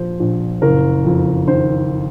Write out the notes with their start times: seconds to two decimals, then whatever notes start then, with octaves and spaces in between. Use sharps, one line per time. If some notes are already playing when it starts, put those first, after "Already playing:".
Already playing: A#2 F3 C5
0.20 A#1
0.62 F#1 A#4
1.05 F2
1.47 D#3 C5